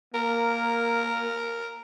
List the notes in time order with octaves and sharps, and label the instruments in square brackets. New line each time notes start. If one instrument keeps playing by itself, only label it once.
[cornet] A#3 [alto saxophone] A#4